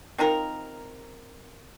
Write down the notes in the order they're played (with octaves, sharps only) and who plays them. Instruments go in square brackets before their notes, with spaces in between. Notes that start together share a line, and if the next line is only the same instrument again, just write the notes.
[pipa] C4 D#4 F4 A#4